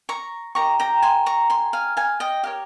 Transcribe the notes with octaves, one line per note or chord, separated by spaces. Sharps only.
A#5 C#6
D#4 G4 A#4 A#5 C#6
G5 A#5
G#5 C6
A#5 C#6
G#5 C6
F5 G#5
F5 G#5
D#5 G5
G4 A#4 C#5 F5